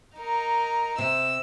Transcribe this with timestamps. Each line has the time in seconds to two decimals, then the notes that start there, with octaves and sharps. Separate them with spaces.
0.17 D#4 A#4
0.98 C3 E6